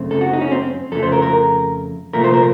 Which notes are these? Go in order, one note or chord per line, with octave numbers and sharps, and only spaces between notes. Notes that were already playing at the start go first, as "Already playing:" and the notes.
Already playing: F#2 C#3 A3 C4
A4
F#4
D#4
C#4
C4
F2 C#3 A3 A4
C5
A#4
A#4
C2 A#2 F3 A3 A#4
C5
A#4